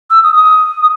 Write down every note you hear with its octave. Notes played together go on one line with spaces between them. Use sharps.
E6
D#6
D#6